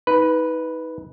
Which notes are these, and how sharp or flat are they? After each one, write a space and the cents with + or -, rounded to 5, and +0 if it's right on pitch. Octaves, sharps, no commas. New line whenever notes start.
D#4 +35 B4 +0